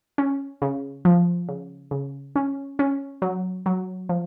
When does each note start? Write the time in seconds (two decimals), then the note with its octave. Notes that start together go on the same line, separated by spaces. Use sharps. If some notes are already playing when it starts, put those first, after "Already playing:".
0.18 C#4
0.62 C#3
1.05 F3
1.49 C#3
1.91 C#3
2.36 C#4
2.79 C#4
3.22 F#3
3.66 F#3
4.09 F3